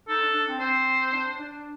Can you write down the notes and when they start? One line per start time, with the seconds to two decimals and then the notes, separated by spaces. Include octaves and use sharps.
0.08 D#4 A4
0.16 C4
0.21 D4
0.34 D4
0.46 C4
0.60 C4 C5
1.11 D4
1.38 D4